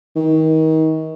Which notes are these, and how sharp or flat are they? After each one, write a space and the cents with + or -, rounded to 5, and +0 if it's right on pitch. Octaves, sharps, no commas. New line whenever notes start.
D#3 +30